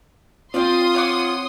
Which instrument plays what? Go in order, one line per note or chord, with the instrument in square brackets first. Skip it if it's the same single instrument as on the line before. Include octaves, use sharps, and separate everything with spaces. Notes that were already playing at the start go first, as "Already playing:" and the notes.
[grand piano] C4 [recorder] F4 [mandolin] G4 D5 [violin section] C6 D#6
[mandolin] C#5 F#5 D6